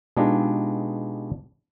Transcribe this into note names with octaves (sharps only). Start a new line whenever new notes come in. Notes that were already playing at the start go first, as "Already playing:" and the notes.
B2 G#3 D4 D#4 F4 G4